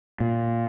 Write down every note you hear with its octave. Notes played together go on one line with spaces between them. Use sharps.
A#2